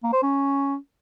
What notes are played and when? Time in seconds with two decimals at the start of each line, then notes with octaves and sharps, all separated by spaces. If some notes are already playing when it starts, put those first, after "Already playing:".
0.03 A#3
0.13 C5
0.22 C#4